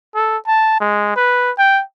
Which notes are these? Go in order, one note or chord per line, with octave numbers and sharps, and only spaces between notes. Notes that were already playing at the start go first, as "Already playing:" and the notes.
A4
A5
G#3
B4
G5